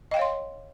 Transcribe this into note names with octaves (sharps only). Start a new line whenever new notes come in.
C#5 D#5 F5 G5 C6